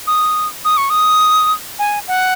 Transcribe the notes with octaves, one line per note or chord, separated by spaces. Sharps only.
D#6
D#6
C#6
D#6
G#5
F#5